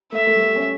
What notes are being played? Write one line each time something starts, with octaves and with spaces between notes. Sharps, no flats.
A3 E5
A3
G3
A3
A3 C#4